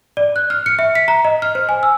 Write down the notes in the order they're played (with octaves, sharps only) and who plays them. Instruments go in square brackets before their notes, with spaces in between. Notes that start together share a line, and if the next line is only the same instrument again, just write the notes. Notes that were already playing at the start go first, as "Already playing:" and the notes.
[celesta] D5
F#6
F6
C#7
E5
B6
A#5
D#5
F6
C5
G#5
E6